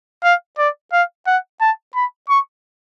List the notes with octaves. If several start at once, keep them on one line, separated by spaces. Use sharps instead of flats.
F5
D5
F5
F#5
A5
B5
C#6